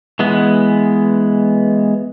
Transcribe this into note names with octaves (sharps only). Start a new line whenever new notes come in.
E3 G#3 B3